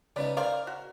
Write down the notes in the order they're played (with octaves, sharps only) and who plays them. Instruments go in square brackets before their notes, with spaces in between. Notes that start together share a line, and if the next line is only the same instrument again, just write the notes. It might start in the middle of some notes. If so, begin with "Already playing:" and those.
[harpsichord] C#3 B3 D#4 [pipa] B4 D5
[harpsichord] G#4 A#4 [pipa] C5 D5 F5
[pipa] F#4